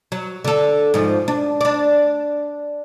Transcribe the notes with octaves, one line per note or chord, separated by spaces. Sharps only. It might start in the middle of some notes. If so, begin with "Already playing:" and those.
F#3
D3 A4
G#2 F3
D4
D4 D5